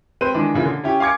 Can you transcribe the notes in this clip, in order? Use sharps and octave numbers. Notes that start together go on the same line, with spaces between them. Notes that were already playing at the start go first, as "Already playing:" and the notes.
C4 B4 C5 D#7
D#3 E3 G#3 D4
A#2 C#3 E3
D3
C#4 E4 G4
F5 G#5 D6 G#6 C#7